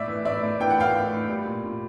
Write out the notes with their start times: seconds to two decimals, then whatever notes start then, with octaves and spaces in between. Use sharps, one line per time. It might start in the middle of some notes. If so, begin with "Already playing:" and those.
Already playing: A2 D5 E5
0.08 E3
0.25 A2 D5 E5
0.43 A2
0.60 E3 G5
0.70 F#5
0.78 A2 F5 G5
0.95 A2
1.12 A2
1.29 G3
1.47 A#2
1.64 A#2